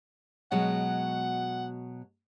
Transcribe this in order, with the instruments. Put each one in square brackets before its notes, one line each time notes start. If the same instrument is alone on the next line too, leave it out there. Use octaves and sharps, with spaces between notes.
[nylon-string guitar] B2 F#3 G#3 [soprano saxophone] F#5